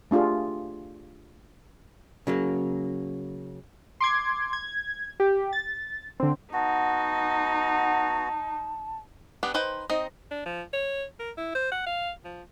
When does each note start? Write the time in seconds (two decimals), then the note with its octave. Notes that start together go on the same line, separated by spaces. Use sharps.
0.11 A3 D4 F4 G4 G#4
2.27 C#3 F#3 A#3
4.00 C6 D6 G#6
4.53 G#6
5.20 G4
5.53 A6
6.20 D3 C4
6.53 B3 D#4 F#4 A5
9.43 B3 D4 G4
9.54 D#4 B4 C5 G5
9.90 C4 D#4 D#5
10.31 D4
10.46 F3
10.73 C#5
11.19 A#4
11.37 E4
11.55 C5
11.72 F#5
11.87 F5
12.24 F3